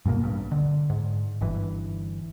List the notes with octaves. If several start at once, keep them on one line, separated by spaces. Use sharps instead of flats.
G2 B2 A3 A#3
A1 G2
D3
G#2
G1 G2 E3